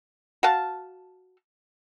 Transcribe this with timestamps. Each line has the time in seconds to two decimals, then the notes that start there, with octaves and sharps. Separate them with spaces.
0.43 F#4 F5 A5